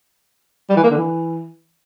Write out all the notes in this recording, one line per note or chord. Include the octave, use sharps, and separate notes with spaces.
G3
E3
A#3
D3
E3